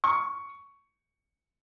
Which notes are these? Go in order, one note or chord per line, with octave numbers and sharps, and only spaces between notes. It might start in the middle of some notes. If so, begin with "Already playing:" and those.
C#6